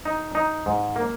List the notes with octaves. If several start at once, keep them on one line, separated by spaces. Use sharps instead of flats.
D#4
D#4
G#2
A#3